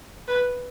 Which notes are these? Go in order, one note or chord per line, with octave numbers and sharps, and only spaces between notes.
B4